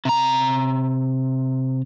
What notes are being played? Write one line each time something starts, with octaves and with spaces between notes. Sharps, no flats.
C3 A#5